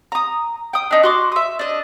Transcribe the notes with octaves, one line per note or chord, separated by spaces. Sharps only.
A#5 D#6
G5 D#6
D4 D#4
F#4 C6 D6
E5 D#6
D4 D#5